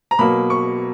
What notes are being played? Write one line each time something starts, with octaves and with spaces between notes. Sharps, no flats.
A#5
B2 F#3 A#3 B5
C#6